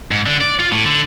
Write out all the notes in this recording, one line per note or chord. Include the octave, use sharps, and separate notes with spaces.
G#2
D3
D5
F4
A2
D3